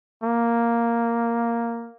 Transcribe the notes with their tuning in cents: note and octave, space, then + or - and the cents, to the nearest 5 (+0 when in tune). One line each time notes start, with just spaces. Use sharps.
A#3 +0